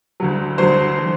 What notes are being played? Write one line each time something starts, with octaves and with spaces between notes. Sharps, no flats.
D2 D3 F#3
D2 D3 F#3 C5
E3